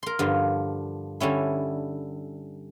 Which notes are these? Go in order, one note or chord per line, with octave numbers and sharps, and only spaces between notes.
A#4 C6
G2 D3 F3
D3 G3 C#4 E4